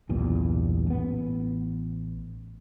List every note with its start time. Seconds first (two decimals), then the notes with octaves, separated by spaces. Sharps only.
0.09 B1 E2 G2 A#2
0.87 A1 B3